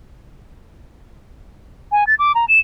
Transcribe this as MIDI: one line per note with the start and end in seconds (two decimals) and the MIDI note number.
1.92 2.07 80
2.07 2.15 93
2.19 2.32 86
2.35 2.45 82
2.48 2.59 100